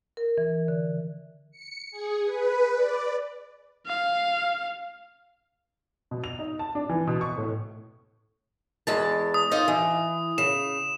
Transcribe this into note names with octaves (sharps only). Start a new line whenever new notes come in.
A#4
E3
D3
C#7
G#4
B4
D5
F5
B2
F7
D#4
A5
D4
E3
B2
C#6
A2
E2 G#3 A5
D#6
D#4 F4 D#5
E3
C#3 E7